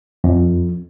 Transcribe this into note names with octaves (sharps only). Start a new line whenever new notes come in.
F2